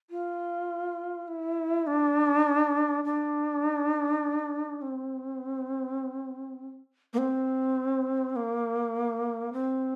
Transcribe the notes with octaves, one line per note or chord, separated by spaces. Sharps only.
F4
E4
D4
D4
C4
A#3
C4
A#3
C4